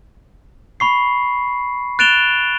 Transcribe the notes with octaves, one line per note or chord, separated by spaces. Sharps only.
B5 C#6 C7
F#6 A6 D7 E7 F7 G7